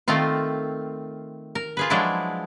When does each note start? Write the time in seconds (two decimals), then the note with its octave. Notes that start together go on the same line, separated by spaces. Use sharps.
0.08 D#3 A3 C4 F4
1.55 A#4
1.77 F4 G#4 B4
1.90 F3 F#3 G#3 D4 E4